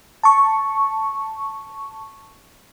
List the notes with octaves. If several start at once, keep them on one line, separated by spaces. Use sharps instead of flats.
A5 C#6